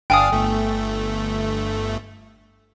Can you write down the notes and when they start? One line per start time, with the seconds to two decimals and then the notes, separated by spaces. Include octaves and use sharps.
0.10 G1 D4 F5 G5 G#5 D#6
0.31 G1 A3